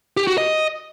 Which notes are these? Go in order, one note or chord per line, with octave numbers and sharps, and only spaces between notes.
G4
F#4
D#5